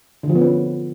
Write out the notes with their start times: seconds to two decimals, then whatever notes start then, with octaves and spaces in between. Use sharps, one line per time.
0.23 D3
0.29 F3
0.36 B3
0.42 C#4